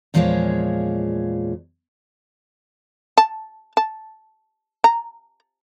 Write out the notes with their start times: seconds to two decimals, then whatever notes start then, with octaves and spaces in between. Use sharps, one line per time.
0.14 E2 A#2 F3 G#3 G#4 C#5
3.18 A5
3.77 A5
4.84 A#5